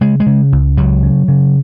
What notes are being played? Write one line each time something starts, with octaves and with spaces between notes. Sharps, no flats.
C#3 G#3
G#3
C#3
C#2
C#2 F#3
C#3
C#3